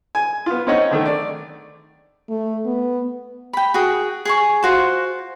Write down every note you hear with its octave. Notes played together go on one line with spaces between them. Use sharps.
G#5
B3 F4
C4 C#4 D#4 C#5 D#5 F#5
D3 D#3 A3
D5
A3
B3
G5 B5
F#4 G#4 G5
G#4 G#5 C#6
F4 F#4 C5